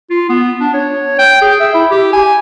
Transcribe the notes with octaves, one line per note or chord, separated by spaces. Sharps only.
F4
B3
D4
C#5
G5
G#4
E5
E4
G4
G#5